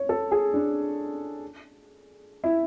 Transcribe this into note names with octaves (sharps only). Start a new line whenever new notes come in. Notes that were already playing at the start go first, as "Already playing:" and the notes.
Already playing: C#5
A4
G#4
D4
E4